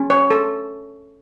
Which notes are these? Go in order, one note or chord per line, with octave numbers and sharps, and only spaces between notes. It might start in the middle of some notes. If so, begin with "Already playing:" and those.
Already playing: C#4
C#5
A4